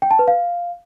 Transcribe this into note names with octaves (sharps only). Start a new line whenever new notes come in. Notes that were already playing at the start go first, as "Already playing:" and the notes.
G5
A5
B4
F5